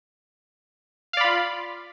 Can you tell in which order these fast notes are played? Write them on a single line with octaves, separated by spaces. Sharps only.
F5 D5 B5 F4